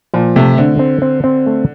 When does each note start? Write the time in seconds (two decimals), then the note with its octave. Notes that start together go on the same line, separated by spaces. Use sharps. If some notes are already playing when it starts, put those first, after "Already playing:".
0.14 A#2 F3
0.36 C3 A3
0.58 D3 C4
0.79 C4
1.02 C4
1.24 C4
1.47 A3